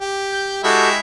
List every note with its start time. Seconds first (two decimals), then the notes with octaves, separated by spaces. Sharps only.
0.01 G4
0.32 G6
0.64 G#3 E4 F#4 G4 A4 E5